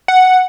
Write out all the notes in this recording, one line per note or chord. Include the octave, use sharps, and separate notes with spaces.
F#5